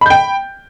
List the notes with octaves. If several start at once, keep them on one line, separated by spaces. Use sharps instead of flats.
G5 B5 G6